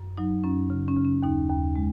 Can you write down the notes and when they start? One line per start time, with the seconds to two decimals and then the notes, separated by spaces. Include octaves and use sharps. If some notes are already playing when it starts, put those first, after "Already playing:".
Already playing: F#2
0.17 F#3 D#4
0.44 F#2 C#4
0.70 C#3
0.88 C#4
0.97 C#3
1.05 C#4
1.23 D#2 D#4
1.49 D#2
1.75 G#3